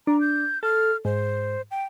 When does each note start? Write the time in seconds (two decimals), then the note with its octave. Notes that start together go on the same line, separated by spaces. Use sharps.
0.07 D4 A#5
0.21 G6
0.63 A4 F6
1.05 G#2 C5
1.71 G5